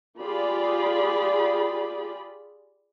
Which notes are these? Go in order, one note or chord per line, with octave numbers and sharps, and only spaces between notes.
F4 G4 G#4 D5 B5